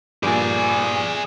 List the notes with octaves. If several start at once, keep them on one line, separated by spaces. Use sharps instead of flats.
G2 A#2 G#4 D5 G#5